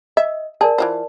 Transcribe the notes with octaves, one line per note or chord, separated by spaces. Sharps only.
D#5 E5
G#4 A#4 D5 A5
E3 F4 C5